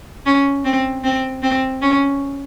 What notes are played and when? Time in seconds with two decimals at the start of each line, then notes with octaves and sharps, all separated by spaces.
0.26 C#4
0.65 C4
1.04 C4
1.42 C4
1.82 C#4